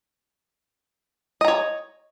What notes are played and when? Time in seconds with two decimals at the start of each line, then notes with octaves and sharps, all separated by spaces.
1.41 D#5
1.45 A#5
1.48 C#5